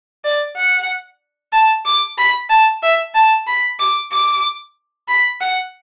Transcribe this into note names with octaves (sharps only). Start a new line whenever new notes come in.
D5
F#5
A5
D6
B5
A5
E5
A5
B5
D6
D6
B5
F#5